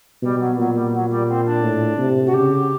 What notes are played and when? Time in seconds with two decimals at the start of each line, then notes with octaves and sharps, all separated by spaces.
0.22 B2 G3
0.39 F#3
0.58 A#2 F#3
0.74 G3
0.93 F#3
1.10 G3
1.28 C4
1.45 D4
1.63 A2
1.98 C3
2.26 F#4
2.33 C#3 G4